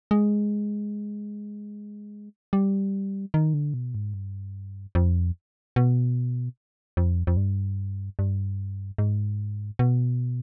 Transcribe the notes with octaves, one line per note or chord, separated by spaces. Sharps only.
G#3
G3
D#3
D3
B2
G#2
G2
F2
B2
F2
F2
G2
G2
G#2
B2